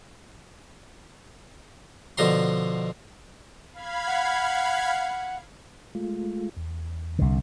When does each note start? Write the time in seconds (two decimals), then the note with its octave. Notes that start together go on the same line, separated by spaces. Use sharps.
2.18 B2 D3 F3 A#5 C6
3.73 F5 B5 G#6
4.07 F#5
5.95 G#3 A3 F4
6.57 E2
7.19 C2 D3